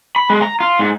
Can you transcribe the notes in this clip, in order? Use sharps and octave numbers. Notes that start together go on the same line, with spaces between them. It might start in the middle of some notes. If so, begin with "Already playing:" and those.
B5
G#3
A#5
F4
G#2